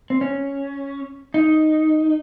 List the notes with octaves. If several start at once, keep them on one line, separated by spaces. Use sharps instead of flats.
C4
C#4
D#4